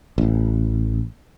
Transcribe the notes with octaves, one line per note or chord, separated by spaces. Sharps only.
A1